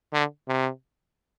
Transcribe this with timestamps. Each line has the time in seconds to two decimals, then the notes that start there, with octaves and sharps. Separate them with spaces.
0.13 D3
0.48 C3